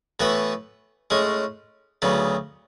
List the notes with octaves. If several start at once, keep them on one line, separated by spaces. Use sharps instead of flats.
A2 E3 B3 F#4 B4
A2 G#3 C#4 G#4
D2 C#3 F#3 B3